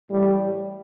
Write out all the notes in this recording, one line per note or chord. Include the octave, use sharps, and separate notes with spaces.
A1 A2 G3